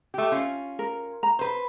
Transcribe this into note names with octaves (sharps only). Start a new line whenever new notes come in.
A3 G4
C#4 F4
A#4
A#5
B4 C5